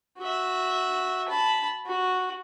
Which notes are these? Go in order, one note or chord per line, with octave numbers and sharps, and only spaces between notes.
F#4 E5
A5 B5
F#4